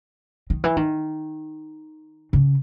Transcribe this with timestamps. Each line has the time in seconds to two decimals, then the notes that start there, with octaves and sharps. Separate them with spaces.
0.50 D#3
0.64 E3
0.77 D#3
2.33 C#3